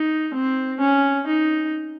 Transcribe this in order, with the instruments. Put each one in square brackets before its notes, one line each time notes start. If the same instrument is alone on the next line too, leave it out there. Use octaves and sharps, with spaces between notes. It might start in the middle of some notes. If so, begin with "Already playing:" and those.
Already playing: [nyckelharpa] D#4
C4
C#4
D#4